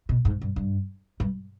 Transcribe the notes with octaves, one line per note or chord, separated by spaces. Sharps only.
B2
G#2
G2
G2
G2